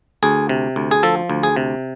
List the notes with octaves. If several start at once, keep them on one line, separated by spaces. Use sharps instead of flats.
D2 G#4
C3
D2
G#4
F3 A4
D2
G#4
C3